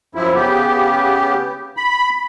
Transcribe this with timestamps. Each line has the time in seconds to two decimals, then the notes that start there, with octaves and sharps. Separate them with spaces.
0.15 F#2 F3 E4
0.34 C#3 B3 G4
1.77 B5